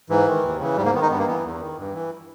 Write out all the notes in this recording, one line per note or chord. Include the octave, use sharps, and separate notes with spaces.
G#2 E3
D#3
D#2
C#3 E3
G#2 G3
A#3
D#3 B3
D#4
G2 B3
A#3
E3 B3
E2
D#3
G2
E3